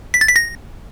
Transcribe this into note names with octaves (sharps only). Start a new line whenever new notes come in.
B6
A6
B6
A#6